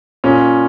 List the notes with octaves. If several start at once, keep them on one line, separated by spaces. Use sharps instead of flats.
A#2 C#4